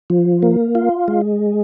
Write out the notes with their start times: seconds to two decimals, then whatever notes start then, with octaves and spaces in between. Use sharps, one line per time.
0.10 F3
0.43 A#3
0.75 F4
1.08 G#3